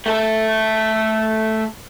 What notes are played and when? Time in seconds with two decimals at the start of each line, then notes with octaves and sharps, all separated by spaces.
0.06 A3 A4